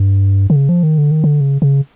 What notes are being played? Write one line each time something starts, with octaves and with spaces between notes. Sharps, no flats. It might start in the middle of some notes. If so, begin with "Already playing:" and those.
Already playing: G2
D3
C#3
F3
D#3
D3
D#3
D3
C#3
C#3